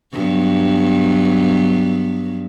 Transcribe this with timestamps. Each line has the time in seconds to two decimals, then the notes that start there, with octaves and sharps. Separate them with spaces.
0.12 G2 F#3 B3